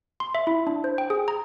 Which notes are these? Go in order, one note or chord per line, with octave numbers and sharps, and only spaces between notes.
C6
E5
E4
D4
C5
G5
G#4
A#5